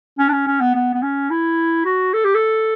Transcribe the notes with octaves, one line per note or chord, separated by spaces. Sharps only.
C#4
D4
C#4
C#4
B3
B3
B3
C#4
E4
F#4
A4
G4
A4